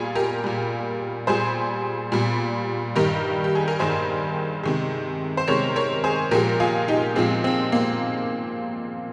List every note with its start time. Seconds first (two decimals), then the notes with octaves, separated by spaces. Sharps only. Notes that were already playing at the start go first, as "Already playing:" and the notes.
Already playing: A#2 G3 F4 G#4
0.15 G4 A#4
0.44 A#2 G3
1.27 A#2 G3 G#4 C5
2.12 A#2 G3
2.96 G2 D#3 G3 G4 A#4
3.44 G4
3.55 G#4
3.68 A#4
3.79 G2 D#3 G3 G#4 C5
4.63 C3 D#3 G#3
5.37 C5
5.47 C3 D#3 G#3 A#4 C#5
5.76 A#4 C#5
6.04 G#4 C5
6.31 A#2 F3 G#3 G4 A#4
6.60 F4 G#4
6.88 D#4 G4
7.16 A#2 F3 G#3 C4
7.44 C4
7.72 A#3